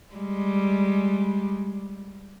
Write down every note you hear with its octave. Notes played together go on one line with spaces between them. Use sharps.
G3 G#3